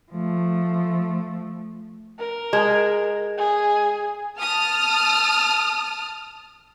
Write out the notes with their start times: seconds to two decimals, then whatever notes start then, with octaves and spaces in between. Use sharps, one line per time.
0.11 F3 A3
2.19 A#4
2.53 G#3
3.38 G#4
4.37 A5 D#6 F6